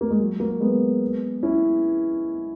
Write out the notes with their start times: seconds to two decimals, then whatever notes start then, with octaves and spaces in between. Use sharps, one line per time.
0.01 A#3
0.10 G#3
0.20 F#3
0.40 F#3 A#3
0.60 G#3 B3
1.43 C#4 E4